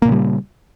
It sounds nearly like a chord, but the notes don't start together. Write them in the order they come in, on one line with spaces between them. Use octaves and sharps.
A#3 A#2 C#3 G3